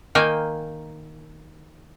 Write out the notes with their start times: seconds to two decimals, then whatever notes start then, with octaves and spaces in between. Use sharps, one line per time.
0.15 D#3 A#3 G5 G#5